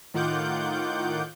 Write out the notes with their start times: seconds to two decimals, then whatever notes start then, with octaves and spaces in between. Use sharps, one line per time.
0.14 A2 D#3 F4 F#5 D6 G6